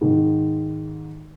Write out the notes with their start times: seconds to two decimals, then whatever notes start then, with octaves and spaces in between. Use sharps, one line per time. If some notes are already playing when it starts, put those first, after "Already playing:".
0.01 G#2 D#3